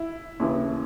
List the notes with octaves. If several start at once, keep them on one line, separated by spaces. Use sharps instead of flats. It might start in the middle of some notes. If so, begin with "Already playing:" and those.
Already playing: E4
D#2 C#3 E3